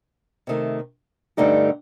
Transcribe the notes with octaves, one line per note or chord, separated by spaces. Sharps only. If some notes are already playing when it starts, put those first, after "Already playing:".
C3 D#3 A3
G2 D3 A3 D#4 G4